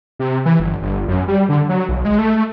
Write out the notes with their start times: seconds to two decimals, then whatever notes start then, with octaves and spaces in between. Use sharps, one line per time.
0.19 C3
0.46 E3
0.60 G1
0.82 G1
1.08 F#2
1.28 G3
1.49 D3
1.69 F#3
1.89 B1
2.05 G#3
2.18 A3